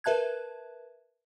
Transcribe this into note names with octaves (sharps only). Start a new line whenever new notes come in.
A#4 B4 E5 A5 F#6 G#6